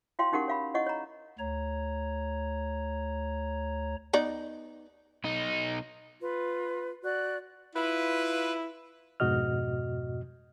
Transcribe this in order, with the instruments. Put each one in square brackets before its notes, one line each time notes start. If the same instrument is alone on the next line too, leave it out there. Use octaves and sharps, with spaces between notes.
[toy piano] E4 F#4 C#5 F5 G5 C6
C#4 D#4 G4 A#4 F#5 C#6
C#5 F5 B5
E4 C#5 D#5 F#5 C#6
C#5 A#5
[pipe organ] D2 C#5 A#5
[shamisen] B3 D#4 D5
[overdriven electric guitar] B1 D#4
[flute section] F4 B4
F#4 D5 F#6
[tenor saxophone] E4 [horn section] F4 B4
[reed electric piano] F2 G#2 B2 F#4 D#5 F6